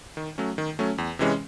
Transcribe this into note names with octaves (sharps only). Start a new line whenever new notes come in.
D#3
F#3 A3 C#4
D#3
F#3 A3 C#4
E2
C3 E3 G#3 C#4